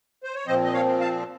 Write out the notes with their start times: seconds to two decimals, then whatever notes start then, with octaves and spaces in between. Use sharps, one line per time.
0.24 C5
0.35 C#5
0.46 A#2 F3 C4 C5 D#5
0.64 D#5
0.73 C#5 F5
1.00 F5 A5